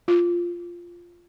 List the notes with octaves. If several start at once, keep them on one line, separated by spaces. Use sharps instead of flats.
F4